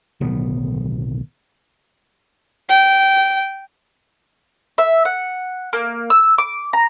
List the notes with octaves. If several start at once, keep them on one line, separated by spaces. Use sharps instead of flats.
D1 B1 D#3 B3
G5
E5
F#5
A#3
E6
D6
A#5